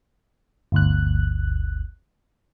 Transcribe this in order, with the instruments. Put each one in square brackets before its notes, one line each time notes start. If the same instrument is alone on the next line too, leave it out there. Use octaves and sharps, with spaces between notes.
[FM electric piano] G1 D2 F#6